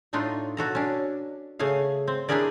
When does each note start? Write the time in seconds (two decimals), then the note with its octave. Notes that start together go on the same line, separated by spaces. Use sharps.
0.13 A2 A3 D4 D#4 F4
0.57 B2 F#4 A4 A#5
0.75 C#4 D4
1.59 C#3 A3 G#4 F5
2.07 C4
2.28 D4 E4 G4 G#4 A#4 D5